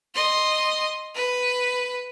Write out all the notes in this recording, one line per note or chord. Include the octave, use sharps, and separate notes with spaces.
D#5 C6
B4